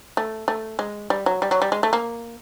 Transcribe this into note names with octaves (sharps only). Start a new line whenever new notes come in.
A3
A3
G#3
G3
F#3
G3
F#3
G3
G#3
A3
A#3